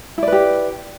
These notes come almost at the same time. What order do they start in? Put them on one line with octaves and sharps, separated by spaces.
E4 D5 B4 G4